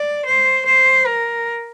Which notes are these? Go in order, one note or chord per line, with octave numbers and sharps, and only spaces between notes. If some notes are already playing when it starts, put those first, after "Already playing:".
Already playing: D5
C5
C5
A#4